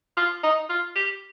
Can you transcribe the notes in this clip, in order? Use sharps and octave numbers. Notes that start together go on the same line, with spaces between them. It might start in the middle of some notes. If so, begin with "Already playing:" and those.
F4
D#4
F4
G4